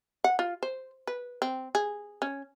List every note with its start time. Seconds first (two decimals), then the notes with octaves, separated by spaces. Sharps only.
0.24 F#5
0.39 F4
0.63 C5
1.07 B4
1.42 C4
1.75 G#4
2.22 C#4